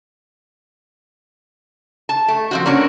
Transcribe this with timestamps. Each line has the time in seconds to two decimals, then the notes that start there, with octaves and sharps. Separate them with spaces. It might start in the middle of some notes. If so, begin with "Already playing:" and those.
2.09 A5
2.28 A3
2.51 F3 C4 F#4
2.66 A#3 C#4 D4 F#4